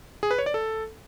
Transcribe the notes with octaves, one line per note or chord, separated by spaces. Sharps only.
G#4
B4
C#5
D5
A4